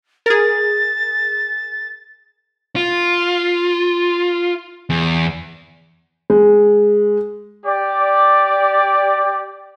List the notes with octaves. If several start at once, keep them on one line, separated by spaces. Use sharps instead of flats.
G#4 A#4 A6
F4
E2
G#3
G4 D5